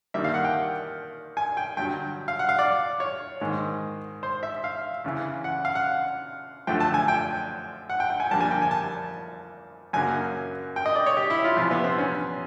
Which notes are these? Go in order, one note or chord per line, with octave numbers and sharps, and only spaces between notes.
G2 D#3 G3 A#3 E5
F5
F#5
G5
G#5
G5
G2 D3 F#3 G5
F5
F#5
F5
D5
C#5
G#2 D#3 G#3
C5
E5
F5
E2 C#3 E3
F#5
F5
F#5
F#2 D3 F3 A3 G5
A5
G#5
G5
F#5
G5
G5
G#5
F2 D3 G3 A#3 A5
G#5
G5
G#5
A5
F#2 C#3 F#3 A#3 G#5
G5
D#5
D5
C#5
G4
E4
F4
F2 C3 E3 F4
B3
C4
C#4